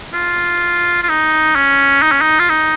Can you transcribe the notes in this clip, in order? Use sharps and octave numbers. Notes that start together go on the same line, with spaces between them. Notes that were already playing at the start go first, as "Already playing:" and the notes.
F4
F4
D#4
C#4
D#4
C#4
D#4
F4
D#4